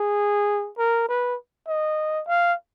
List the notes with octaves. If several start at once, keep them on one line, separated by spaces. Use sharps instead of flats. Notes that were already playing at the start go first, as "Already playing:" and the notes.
Already playing: G#4
A#4
B4
D#5
F5